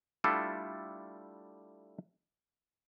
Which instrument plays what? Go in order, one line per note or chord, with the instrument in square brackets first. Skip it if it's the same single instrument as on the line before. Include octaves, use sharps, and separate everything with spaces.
[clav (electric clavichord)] G3 A3 D4 E4 F4 A4